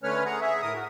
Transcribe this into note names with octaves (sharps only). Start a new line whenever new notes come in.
D3 A3 C#4 B4 C#5 F6
G#4 F#5 A#5
G#4 E5
A2 A#4 D#6
F#4